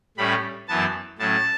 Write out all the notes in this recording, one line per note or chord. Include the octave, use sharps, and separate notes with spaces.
A2 G3 C#4 B5
F#2 E3 B3 A5
A2 F#3 C#4 A5